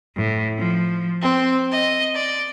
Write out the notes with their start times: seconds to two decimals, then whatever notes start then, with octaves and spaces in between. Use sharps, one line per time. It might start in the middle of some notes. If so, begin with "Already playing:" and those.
0.16 A2
0.59 F3
1.22 C4
1.71 D#5
2.16 D5